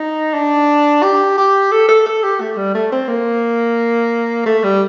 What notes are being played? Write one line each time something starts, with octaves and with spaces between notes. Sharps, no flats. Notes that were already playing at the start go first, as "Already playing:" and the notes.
Already playing: D#4
D4
G4
G4
A4
A4
A4
G4
A3
G3
A3
C4
A#3
A3
G3